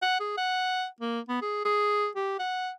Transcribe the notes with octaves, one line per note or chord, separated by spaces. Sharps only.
F#5
G#4
F#5
A#3
B3
G#4
G#4
G4
F#5